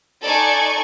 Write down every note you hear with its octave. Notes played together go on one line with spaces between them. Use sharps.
D#4 A4 D5 G#5 C#6